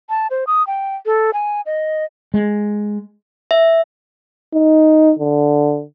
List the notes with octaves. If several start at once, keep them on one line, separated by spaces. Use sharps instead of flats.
A5
C5
D#6
G5
A4
G#5
D#5
G#3
E5
D#4
D3